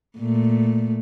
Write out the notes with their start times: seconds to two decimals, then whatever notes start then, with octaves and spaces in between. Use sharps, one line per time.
0.19 A#2 A3